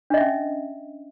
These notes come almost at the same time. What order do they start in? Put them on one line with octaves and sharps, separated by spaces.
D4 D#5 E5 C#4